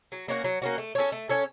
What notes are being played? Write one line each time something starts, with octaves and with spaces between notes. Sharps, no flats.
F#3
A#3 C#4 F#4
F#3
A#3 C#4 F#4
A3
C#4 A4 C#5
A3
C#4 A4 C#5